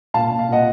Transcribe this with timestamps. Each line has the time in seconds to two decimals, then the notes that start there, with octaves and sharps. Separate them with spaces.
0.14 A#2 F5 A5
0.31 A#2
0.39 F5
0.49 A#2 D#5 F#5